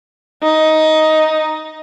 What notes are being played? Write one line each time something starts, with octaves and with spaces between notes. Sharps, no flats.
D#4